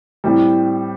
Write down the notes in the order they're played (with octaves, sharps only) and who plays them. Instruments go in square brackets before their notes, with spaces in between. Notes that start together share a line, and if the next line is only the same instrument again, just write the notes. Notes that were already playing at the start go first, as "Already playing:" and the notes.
[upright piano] A2 G3 C4